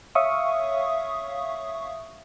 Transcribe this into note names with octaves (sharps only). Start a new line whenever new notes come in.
C#5 E5 F5 C#6 D#6